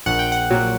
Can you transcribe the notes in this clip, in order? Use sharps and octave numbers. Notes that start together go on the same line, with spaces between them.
A#1 F#5
G5
F#5
A#2 F#3